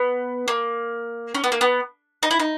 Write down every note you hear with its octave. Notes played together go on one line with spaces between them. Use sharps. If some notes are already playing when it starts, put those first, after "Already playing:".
Already playing: B3
A#3
C#4
B3
A#3
B3
D#4
E4
D#4